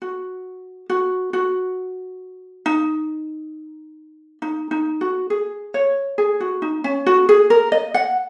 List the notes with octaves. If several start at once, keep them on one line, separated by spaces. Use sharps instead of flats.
F#4
F#4
F#4
D#4
D#4
D#4
F#4
G#4
C#5
G#4
F#4
D#4
C#4
F#4
G#4
A#4
D#5
F#5